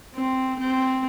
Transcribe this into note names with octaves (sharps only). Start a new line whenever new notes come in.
C4
C4